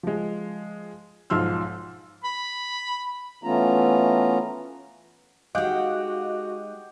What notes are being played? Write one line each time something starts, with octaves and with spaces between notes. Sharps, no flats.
F3 G#3
B1 G#2 F3 C6 E6 F6
B5
E3 A3 B3 C#4 F4 A#5
G#3 D#4 F#4 G4 D#5 F5 F#5 D6